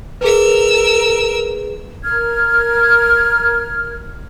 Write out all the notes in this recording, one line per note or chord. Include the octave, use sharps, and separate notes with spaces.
G#4 A#4 B4 E6
A#4 F6 G#6